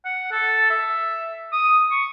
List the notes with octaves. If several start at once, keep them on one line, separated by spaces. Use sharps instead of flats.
F#5
A4
E5
D#6
C#6